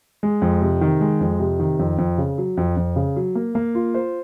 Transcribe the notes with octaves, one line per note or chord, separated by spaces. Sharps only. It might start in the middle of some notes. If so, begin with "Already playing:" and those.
G#3
F2
C3
D#3
G#3
F2
C3
D#3
F2
F2
C#3
F#3
F2
F2
C#3
F#3
A#3
A#3
F4
C5